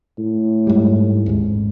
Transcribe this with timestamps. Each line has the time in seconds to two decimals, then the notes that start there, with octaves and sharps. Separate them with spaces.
0.18 A2
0.67 G#2 G3
1.26 D#1 G#1 G#2